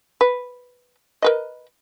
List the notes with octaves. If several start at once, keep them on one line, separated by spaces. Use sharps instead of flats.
B4
A#4 B4 D#5